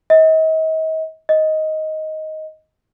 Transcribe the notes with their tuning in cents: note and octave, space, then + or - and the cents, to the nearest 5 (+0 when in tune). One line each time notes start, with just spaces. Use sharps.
D#5 +40
D#5 +10